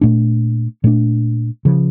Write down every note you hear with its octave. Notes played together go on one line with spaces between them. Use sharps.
A#2 A3 D4
A#2 A3 D4
C#3 F3